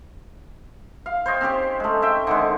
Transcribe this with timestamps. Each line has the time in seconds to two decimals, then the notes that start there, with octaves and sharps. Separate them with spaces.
1.06 F5
1.26 C5 C#5 D#5 G5
1.41 C4 C#4 G4 C5
1.80 G#3 A3
2.02 E5 G5
2.27 D3 D#3 G#3